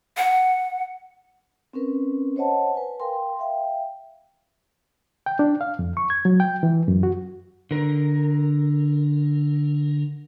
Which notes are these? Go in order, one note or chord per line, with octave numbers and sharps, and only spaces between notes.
F#5
C4 C#4 A#4 B4
C5 C#5 D#5 F#5 A5
B4 G#5
A#4 F5 G5 C6
E5 F5 G5
G5
D4
F5
F2
C#6
G#6
F#3
G5
E3
F#2
F#4
D3 A#4